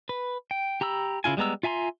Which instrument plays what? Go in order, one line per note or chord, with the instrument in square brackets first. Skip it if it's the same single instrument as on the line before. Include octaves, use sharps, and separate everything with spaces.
[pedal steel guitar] B4
G5
G4 A#5 B5 E6
C#3 E4 F4 G#5
G3 G#3 B3 A#5 E6
F4 E5 G#5 A#5 C6